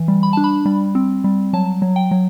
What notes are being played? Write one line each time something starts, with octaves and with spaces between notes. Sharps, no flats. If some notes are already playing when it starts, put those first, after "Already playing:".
Already playing: E3
G3
B5
D4 A5
B5
G3
C4
G3
F#3 A5
F#3
G5
F#3